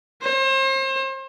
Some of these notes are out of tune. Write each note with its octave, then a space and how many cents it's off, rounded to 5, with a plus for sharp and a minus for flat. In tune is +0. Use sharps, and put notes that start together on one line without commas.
C5 +35